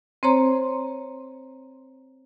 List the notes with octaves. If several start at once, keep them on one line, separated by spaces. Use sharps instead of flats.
C4 C5 C#5 A#5 C6